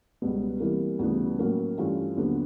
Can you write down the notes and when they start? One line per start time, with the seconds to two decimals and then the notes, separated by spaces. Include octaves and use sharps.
0.22 C#2 B2 G3 B3
0.60 C3 E3 G3 A#3
0.99 D2 C#3 E3 G3 B3
1.38 A2 F#3 A#3 C#4
1.78 G2 E3 A3 C#4 F4
2.17 D#2 D3 F#3 B3